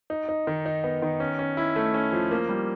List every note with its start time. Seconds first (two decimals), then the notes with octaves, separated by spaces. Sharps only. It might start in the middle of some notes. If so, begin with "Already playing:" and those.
0.10 D#4
0.29 D#4
0.47 D#3
0.66 D#4
0.84 B3
1.02 D#3
1.20 C#4
1.39 C#4
1.57 E4
1.76 A3
1.94 C#4
2.12 F3
2.31 A#3
2.49 G3